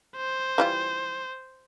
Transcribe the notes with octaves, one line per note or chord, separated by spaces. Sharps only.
C5
E3 G3 F4